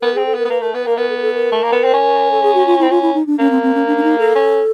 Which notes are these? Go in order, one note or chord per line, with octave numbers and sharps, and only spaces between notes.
B3 A#4
C4 G#4
A4
B3
A#4
B3
A#3 B4
A3 A#4
B3 B4
A#3 A#4
B3 A#4
A4
A#4
A4
A#4
A3
A#3
B3
C4
C#4
A4
G#4
F#4
F4
C4 E4
C#4 F4
E4
D#4
D4
A#3 C#4
C4
C4
C#4
D4
D4
D#4
A4
C#4